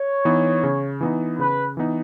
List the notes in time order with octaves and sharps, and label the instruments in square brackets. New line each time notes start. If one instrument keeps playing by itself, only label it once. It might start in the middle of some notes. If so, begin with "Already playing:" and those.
Already playing: [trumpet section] C#5
[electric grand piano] E3 B3 D#4
C#3
E3 B3 D#4
[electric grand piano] C#3 [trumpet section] B4
[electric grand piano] E3 B3 D#4